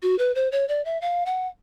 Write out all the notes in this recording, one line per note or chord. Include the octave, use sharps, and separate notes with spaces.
F#4
B4
C5
C#5
D5
E5
F5
F#5